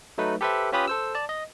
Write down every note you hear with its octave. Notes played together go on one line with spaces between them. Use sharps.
F#3 A3 D#4 B4
G4 A4 B4 C5 E5
C#4 F4 G4 B4 B5 D#6
A4 C5 E6
D5 A5
D#5